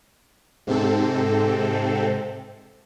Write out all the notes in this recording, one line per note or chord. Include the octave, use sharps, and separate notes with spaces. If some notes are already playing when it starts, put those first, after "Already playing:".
G#2 C3 C4 A4